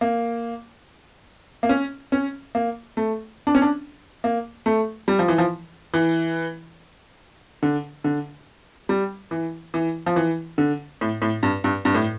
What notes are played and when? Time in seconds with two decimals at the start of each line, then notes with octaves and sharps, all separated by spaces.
0.01 A#3
1.63 A#3
1.69 C#4
2.12 C#4
2.55 A#3
2.97 A3
3.47 D4
3.55 C#4
3.62 D4
4.24 A#3
4.66 A3
5.08 G3
5.19 F3
5.28 E3
5.38 F3
5.94 E3
7.63 D3
8.04 D3
8.89 G3
9.31 E3
9.74 E3
10.06 F3
10.16 E3
10.58 D3
11.01 A2
11.22 A2
11.43 G2
11.64 G2
11.85 G2
11.94 A2